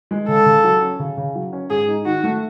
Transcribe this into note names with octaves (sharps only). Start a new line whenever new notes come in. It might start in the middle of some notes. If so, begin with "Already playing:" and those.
G#3
C#3 A4
C#3
F#3
C#4
C#3
C#3
F#3
C#4
G#2 G#4
D#4
D#3 F#4
A3